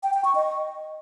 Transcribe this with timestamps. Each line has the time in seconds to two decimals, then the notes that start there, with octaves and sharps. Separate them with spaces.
0.03 G5
0.14 G5
0.25 C#6
0.35 D#5